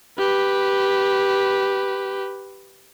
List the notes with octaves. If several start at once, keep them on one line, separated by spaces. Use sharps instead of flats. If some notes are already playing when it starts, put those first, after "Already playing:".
G4 B4